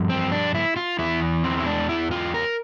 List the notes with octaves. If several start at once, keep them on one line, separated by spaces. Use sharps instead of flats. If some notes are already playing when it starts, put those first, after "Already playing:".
Already playing: G2 F3
C4
D4
E4
F4
E2 E3 E4
C4
E4
D4
E4
F4
A#4